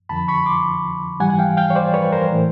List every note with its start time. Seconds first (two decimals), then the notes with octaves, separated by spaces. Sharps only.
0.09 F2 D3 F3 A5 B5
0.28 B5 C#6
0.46 C6 D6
1.20 G#2 E3 G3 F#5 G#5
1.30 F#5
1.39 F5 G5
1.57 F5 G5
1.70 C#5
1.75 C5 D5
1.94 B4 C#5
2.12 A#4 C5
2.31 A2 E3 A3